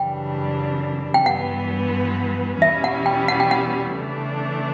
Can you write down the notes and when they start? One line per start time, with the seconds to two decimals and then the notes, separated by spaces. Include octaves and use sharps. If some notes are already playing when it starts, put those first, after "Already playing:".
Already playing: F#2 C#3 E3 G3 D4 G5
1.14 G5
1.26 G2 E3 B3 F#5
2.61 E2 B2 G3 C#4 E4 E5
2.84 F#5
3.06 G5
3.28 F#5
3.40 G5
3.51 F#5
3.96 C#3 E3 A3 D4